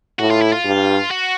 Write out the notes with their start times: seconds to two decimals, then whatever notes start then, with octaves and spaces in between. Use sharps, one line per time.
0.19 A2 F#4
0.30 F4
0.41 E4
0.52 F4
0.65 G2
1.11 F#4